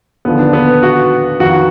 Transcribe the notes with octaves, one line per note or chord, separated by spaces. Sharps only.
D#2 D3 F3 B3
D4
B3
F#4
F2 D#3 F#4